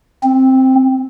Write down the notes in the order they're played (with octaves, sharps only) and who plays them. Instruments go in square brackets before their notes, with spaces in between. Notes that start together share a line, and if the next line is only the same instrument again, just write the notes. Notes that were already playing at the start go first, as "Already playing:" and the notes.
[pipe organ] C4